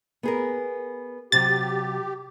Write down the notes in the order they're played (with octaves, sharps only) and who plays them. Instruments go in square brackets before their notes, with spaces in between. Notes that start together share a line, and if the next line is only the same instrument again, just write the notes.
[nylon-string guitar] B3 G#4 A#4
[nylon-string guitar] C3 F#3 [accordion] G4 [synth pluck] A6